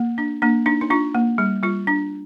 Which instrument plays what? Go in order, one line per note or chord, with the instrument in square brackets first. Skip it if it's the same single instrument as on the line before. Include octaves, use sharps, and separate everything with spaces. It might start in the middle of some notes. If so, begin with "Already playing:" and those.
Already playing: [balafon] A#3
D4
A#3 D4
D4 D#4
D#4
D4 F4
A#3
G3
G3 F4
D4